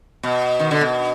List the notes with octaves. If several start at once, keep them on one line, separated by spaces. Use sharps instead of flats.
B2
D#3
D3
B2